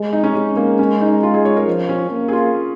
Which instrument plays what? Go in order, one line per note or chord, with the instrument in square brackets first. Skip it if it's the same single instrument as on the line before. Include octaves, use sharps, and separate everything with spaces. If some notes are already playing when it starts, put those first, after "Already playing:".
Already playing: [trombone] G#3
[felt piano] D#4
C#4
[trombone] G#3 [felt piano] C#4
[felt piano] A#3
C#4
D#4
F4
G#4
C#5
A#4
[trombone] F3
[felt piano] C#4
[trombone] A#3
[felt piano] G#4
F4